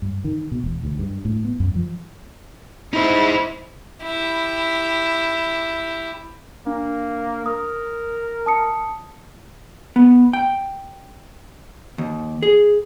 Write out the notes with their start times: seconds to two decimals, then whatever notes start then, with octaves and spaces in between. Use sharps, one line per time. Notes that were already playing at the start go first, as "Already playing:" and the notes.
0.02 G2
0.24 D#3
0.51 B2
0.64 E1
0.84 D2
0.99 G2
1.25 A2
1.45 B3
1.60 F#2
1.76 F3
2.94 D#4 E4 C5
4.03 E4 G4
6.67 A#3 D4
7.46 A#4 D#6
8.46 A5 D#6 C#7
9.96 B3
10.33 G5
11.98 D#2
12.42 G#4